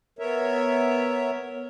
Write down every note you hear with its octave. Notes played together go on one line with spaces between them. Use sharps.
B3 A#4 C#5 E5